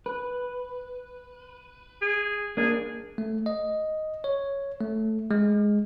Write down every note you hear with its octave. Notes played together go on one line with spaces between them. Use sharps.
B4
G#4
A#3 D4 G#4
A3
D#5
C#5
A3
G#3